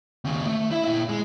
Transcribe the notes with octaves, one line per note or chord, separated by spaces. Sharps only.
D#2 C#3
A3
E4 E5
A#2 E4
G#3